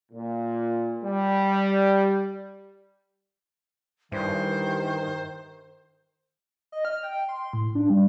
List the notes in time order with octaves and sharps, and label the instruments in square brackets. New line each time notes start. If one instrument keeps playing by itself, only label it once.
[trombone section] A#2
G3
[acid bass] G2 [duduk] D#3 [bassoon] E3 [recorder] C5
[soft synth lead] D#5
F6
G5
C6
A2
D4
G3